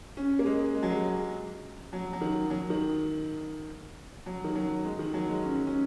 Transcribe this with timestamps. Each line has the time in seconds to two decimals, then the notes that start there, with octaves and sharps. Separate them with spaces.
0.17 C#4
0.39 A#3
0.46 G#3
0.75 G#3
0.83 F#3
0.90 G#3
1.93 F#3
2.13 F#3
2.21 D#3
2.50 F#3
2.70 D#3
4.26 F#3
4.44 D#3
4.55 F#3
4.85 G#3
4.99 D#3
5.14 F#3
5.28 G#3
5.43 C#4
5.67 C#4